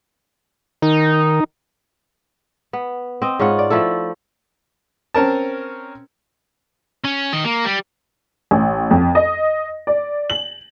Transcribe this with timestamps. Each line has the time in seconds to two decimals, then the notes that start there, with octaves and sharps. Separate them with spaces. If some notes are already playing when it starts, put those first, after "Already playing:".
0.82 D#3 D#4
2.73 B3
3.22 C4 D#5
3.39 G#2 C#4 F4 F#5
3.59 D5
3.70 F3 A3 E4 A4
5.14 C4 C#4 A#4 A5
7.04 C#4
7.33 D#3 D#5
7.45 A#3
7.65 G3
8.51 A1
8.91 F2
9.15 D#5
9.87 D5
10.30 F#7